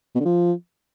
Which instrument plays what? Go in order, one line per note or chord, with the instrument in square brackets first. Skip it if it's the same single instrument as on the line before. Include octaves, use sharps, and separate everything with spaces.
[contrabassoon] B2
D3
F3